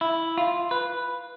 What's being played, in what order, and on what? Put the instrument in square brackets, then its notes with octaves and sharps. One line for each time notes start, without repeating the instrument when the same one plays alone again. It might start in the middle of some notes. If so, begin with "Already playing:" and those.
[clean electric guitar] E4
F4
B4